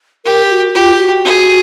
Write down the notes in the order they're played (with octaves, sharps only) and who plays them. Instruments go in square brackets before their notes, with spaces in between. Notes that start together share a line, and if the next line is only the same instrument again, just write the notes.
[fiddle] G4 [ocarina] A#4
[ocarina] F#4
[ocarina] F4 [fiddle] G4
[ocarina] F#4
[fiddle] G#4